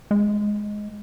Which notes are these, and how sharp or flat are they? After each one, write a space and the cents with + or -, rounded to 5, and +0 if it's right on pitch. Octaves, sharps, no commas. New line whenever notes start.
G#3 +5